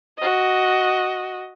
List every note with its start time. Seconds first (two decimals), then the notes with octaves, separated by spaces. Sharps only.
0.18 F#4 D#5